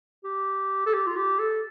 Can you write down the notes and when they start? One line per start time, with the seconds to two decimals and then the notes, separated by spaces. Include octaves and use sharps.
0.24 G4
0.86 A4
0.94 G4
1.07 F4
1.16 G4
1.40 A4